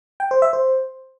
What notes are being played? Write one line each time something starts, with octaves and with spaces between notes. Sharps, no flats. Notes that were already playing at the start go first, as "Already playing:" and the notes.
G5
C5
E5
C5